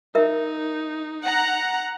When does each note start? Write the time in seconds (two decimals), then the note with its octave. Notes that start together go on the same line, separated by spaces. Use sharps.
0.15 D#4 A#4 E5
1.24 F#5 A#5